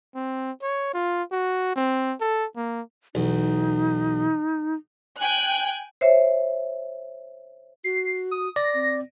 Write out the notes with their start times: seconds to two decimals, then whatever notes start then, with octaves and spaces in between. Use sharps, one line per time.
0.15 C4
0.62 C#5
0.94 F4
1.32 F#4
1.76 C4
2.20 A4
2.56 A#3
3.15 B1 E2 D#4
5.19 G5 G#5 F#6
6.01 C5 C#5 E5
7.84 F#4 C7
8.31 D#6
8.56 D5 A#6
8.74 C4